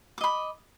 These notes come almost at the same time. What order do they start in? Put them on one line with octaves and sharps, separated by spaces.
D6 D#5 B5